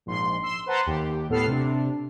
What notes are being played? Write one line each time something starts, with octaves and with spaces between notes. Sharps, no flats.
A#1 G#2 C6
C6 E6
B4 C5 F#5 A5 A#5 C6
D#2 G4
A2 B3 A4 F6 C7
C3 D4